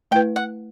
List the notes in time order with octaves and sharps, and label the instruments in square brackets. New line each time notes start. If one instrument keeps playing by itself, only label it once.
[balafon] A3 E4 B4 [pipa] G5
[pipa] F#5